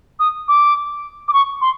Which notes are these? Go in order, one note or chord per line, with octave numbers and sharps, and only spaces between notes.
D#6
D6
D6
C#6
C6